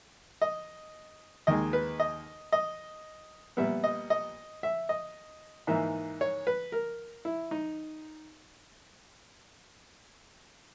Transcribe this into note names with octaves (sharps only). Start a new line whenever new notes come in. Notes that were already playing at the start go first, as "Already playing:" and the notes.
D#5
D#2 D#3 G#3 D#5
B4
D#5
D#5
A#2 G3 B3 E5
D#5
D#5
E5
D#5
G#2 E3 A#3 D#4 E5
C#5
B4
A#4
E4
D#4